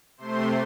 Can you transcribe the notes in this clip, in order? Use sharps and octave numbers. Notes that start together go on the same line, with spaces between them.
C3 A3 C5 C6